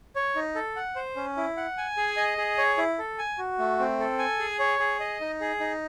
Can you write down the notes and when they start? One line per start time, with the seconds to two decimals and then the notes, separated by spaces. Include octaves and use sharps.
0.16 C#5
0.36 D#4
0.55 A4
0.76 F#5
0.96 C5
1.16 C#4
1.37 E4
1.57 F#5
1.78 G#5
1.97 G#4
2.17 D#5
2.38 G#4
2.58 C#5
2.77 E4
2.98 A4
3.18 G#5
3.38 F#4
3.59 A3
3.79 C4
4.00 A4
4.19 G#5
4.39 G#4
4.59 C#5
4.79 G#4
5.00 D#5
5.20 D#4
5.41 G#4
5.60 D#4